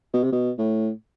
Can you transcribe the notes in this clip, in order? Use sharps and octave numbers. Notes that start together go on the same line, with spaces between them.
B2
C3
B2
A2